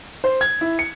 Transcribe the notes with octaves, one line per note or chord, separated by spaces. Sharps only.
C5
G#6
E4
C#7